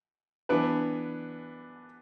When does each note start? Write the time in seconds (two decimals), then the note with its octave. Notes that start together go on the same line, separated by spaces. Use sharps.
0.49 E3 B3 D4 B4